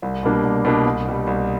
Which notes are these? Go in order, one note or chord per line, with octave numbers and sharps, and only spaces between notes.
C2
B2 G3 A#3 D4
C2
B2 G3 A#3 D4
C2
B2 G3
C2